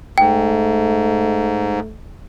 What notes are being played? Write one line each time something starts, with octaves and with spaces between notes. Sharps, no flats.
G#2 A3 G5